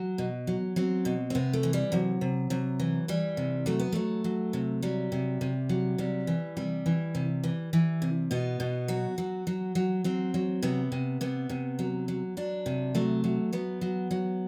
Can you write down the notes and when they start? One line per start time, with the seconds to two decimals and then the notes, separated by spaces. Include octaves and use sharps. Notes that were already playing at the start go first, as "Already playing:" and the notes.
Already playing: F#3
0.18 B2
0.47 F#3
0.76 F#3 C4
1.05 B2
1.30 C4
1.35 C3 B3
1.53 A3
1.63 E3
1.73 G3
1.92 C3 F#3
2.21 C3
2.50 C3 F#3
2.80 E3
3.08 E3 G3
3.37 C3
3.66 F#3 A3
3.79 B3
3.92 F#3 A3
4.24 F#3
4.53 C3
4.82 F#3 G3
5.12 C3
5.41 C3
5.69 F#3
5.98 C3 G3
6.27 E3
6.57 C3 G3
6.86 E3
7.15 C3
7.44 E3
7.73 E3
8.02 C3
8.31 B2 B3
8.60 B2
8.88 F#3 F#4
9.18 F#3
9.47 F#3
9.75 F#3
10.04 F#3 C4
10.34 F#3
10.63 C3 B3
10.92 C3
11.21 C3 B3
11.49 C3
11.79 F#3
12.08 F#3
12.37 F#3 D4
12.66 C3
12.95 F#3 A3
13.24 F#3
13.53 F#3 B3
13.81 F#3
14.11 F#3